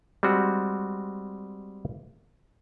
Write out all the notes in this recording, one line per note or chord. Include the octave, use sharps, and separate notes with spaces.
G3 G#3 C4 F#4